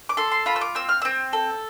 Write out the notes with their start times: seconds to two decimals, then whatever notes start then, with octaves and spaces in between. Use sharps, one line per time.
0.09 D6
0.17 A4 C6
0.32 C6
0.46 F4 B5
0.56 E6
0.61 D6
0.75 C4 E6
0.89 F6
1.02 C4 E6
1.33 A4